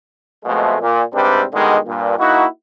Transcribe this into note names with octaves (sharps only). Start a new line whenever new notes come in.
F2 B2 F3 G#3 A3
A#2
G#2 C3 G3 C4 D4 B4
B2 D3 D#3 G3 G#3
G2 A#2
A#3 D#4 E4 F#4